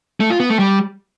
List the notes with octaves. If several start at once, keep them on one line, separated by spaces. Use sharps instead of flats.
A3
F4
B3
A3
G3